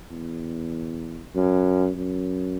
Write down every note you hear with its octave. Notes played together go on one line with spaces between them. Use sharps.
E2
F#2
F#2